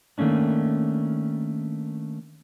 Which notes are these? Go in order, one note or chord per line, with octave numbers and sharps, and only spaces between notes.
D#3 A3 A#3 C#4 D4